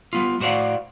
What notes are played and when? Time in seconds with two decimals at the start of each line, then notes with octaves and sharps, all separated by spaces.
0.13 G3 B3 F4
0.40 A2 F#4 C5 D5 F5 F#5